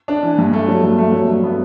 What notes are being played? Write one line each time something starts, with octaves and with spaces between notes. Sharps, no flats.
D4
E3
G2
A3
F#3
G2
A3
F#3
G2
B3